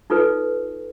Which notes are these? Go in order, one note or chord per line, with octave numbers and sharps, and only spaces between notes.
D#4 F4 A4 B4